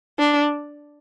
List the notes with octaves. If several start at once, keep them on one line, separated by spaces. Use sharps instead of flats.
D4